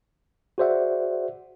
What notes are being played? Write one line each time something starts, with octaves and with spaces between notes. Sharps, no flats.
F#4 G#4 C5 D5 E5 F#5